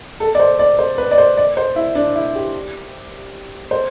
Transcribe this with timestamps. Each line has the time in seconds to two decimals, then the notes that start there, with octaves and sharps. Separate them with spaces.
0.20 A4
0.35 D5
0.40 C5
0.59 D5
0.79 C5
0.98 B4
1.11 D5
1.18 C5
1.37 D5
1.57 C5
1.76 E4
1.95 D4
2.16 E4
2.35 G4
3.71 C5